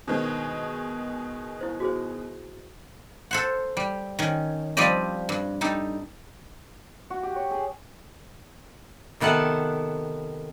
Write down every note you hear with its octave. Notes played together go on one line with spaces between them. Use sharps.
B2 D#3 G#3 D4 C5
E4 C5
F#4 G#4 C5
A4 C5 F#5
G3
D#3 C#4
F3 G3 C4 G4 D5 D#5
G2
G3 D#4 A4
F#4
G4
C#5
G#4
C3 D#3 B3 A4 F#5